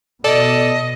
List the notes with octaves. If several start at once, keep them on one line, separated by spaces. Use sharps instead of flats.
B2 A4 D5 D#5